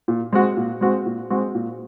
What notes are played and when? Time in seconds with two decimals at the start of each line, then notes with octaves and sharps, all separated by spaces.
0.08 A#2
0.33 G#3 C4 F#4
0.57 A#2
0.81 G#3 C4 F#4
1.06 A#2
1.30 G#3 C4 F#4
1.55 A#2